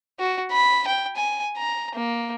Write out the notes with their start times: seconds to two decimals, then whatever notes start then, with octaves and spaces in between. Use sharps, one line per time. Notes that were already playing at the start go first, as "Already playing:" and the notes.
0.19 F#4
0.52 B5
0.87 G5
1.16 G#5
1.58 A#5
1.95 A#3